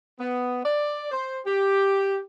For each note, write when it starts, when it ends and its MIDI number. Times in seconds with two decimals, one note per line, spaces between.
0.19 0.61 59
0.63 1.07 74
1.11 1.39 72
1.45 2.20 67